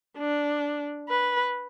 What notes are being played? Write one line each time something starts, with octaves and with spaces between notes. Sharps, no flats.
D4
B4